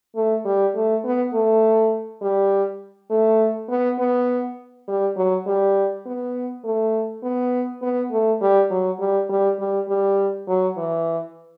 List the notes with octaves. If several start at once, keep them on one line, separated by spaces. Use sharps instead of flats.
A3
G3
A3
B3
A3
G3
A3
B3
B3
G3
F#3
G3
B3
A3
B3
B3
A3
G3
F#3
G3
G3
G3
G3
F#3
E3